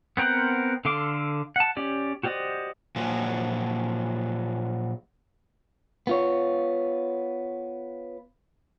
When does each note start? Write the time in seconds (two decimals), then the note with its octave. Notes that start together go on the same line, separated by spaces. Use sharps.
0.17 B3 C4 A#4 C5 F#5
0.85 D3 A4 F5 C6 D6
1.56 F#5 A5
1.77 C#4 G4 D5
2.23 F#4 G4 C5 D5 D#5
2.96 A#2 F3 F#3
6.07 B3 F4 C#5